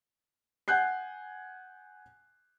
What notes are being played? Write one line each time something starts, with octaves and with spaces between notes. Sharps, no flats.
F#5 G#5 F#6 G6 C7